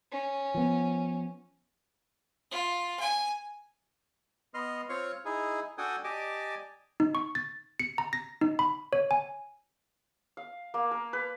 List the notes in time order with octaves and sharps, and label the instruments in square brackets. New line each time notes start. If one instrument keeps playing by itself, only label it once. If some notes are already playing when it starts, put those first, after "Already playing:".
[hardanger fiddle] C#4
[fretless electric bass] F3 B3
[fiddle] F4
G#5
[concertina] B3 D#5 C6 F6
C4 F4 C#5 F5 C#6 F6
D#4 E4 G#4
D4 F#4 A4 G5 G#5 D#6
G4 D5 D#5 G#5 A5 D6
[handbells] D#4
C#6
A6
C#7
A#5
A#6
D#4
B5
C#5
G#5
[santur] F5
A#3
A#4
B4